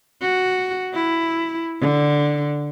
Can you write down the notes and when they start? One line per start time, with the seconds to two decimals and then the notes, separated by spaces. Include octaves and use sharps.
0.21 F#4
0.94 E4
1.80 D3